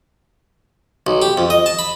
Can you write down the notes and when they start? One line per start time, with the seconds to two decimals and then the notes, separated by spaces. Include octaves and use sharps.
1.07 B1
1.22 G4
1.37 F2
1.50 D#5
1.66 A5
1.79 B5